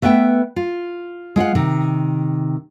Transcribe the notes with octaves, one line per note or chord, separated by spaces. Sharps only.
A3 B3 B4 E5 G5
F4
G#3 F4 F5 F#5
C3 D#3